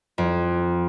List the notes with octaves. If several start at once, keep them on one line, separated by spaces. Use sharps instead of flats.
F2